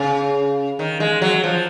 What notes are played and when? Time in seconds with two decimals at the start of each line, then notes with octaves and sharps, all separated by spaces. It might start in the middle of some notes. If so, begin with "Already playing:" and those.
Already playing: C#3
0.79 D#3
1.00 G#3
1.22 F#3
1.43 F3